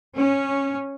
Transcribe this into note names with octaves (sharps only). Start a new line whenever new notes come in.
C#4